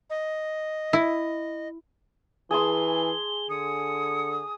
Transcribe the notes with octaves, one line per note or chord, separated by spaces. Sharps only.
D#5
E4
E3 G#4 A5 C6 G7
D3 D#6 C#7